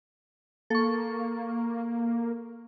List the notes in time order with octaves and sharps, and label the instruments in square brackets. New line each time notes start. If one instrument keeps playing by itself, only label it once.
[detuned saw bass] A#3 [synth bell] A4 C#6